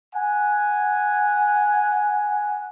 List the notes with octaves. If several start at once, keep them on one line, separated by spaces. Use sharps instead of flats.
F#5 G#5